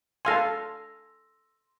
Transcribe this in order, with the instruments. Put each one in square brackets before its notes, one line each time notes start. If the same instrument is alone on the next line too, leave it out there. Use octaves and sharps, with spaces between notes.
[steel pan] A4 F5 G#5 [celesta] C6 E6 A#6